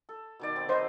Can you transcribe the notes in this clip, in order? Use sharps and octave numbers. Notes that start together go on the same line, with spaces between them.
A4
B2 D#3 D5
C4
F#3 B4 C5 D#5 C6